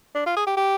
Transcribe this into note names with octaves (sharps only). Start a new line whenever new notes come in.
D4
F4
G#4
G4
G4